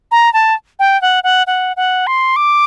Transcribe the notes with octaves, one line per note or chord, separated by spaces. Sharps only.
A#5
A5
G5
F#5
F#5
F#5
F#5
C6
D6